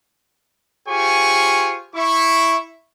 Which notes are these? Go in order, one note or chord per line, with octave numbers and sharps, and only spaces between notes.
F4 G4 G#4 C5 G#5 C#6
E4 C#6